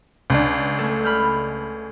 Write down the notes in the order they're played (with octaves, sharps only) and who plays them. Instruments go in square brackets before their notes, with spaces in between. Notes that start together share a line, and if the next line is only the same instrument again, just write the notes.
[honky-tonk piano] C#2 D4
[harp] A3 C#4 A4
B5 F6 G6